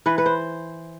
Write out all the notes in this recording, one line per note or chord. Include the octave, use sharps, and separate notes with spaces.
E3 B4
B4
C5